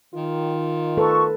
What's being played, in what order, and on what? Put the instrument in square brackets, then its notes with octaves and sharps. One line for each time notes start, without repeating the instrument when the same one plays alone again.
[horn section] D#3 [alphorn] F4
[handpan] A4 B4 [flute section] C#6